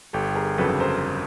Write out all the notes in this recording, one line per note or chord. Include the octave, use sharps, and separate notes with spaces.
G1 G4 A4
G#4 A#4
F2 C#3 F#3 A4 B4
A#4 C5